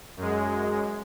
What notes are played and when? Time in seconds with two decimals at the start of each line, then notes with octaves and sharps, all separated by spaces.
0.17 F#2 G#3